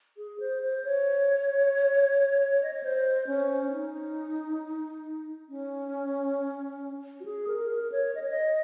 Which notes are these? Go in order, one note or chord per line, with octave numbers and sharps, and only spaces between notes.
G#4
C5
C5
C#5
D#5
C#5
C5
C#4
C#4
D#4
C#4
F#4
G#4
A#4
A#4
C#5
D#5
C#5
D#5